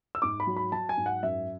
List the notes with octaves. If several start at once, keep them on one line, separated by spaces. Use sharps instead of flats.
E6
G#2 D6
B5
F#3
B5
F#3 A5
G#5
G#2
F#5
F#2 E5